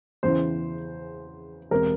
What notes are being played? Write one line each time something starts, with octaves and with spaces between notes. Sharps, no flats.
E2 C#3 E3 C5
E1 C3 A#4